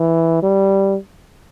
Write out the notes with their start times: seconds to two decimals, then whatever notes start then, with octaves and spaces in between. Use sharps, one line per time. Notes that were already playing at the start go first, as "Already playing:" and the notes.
Already playing: E3
0.42 G3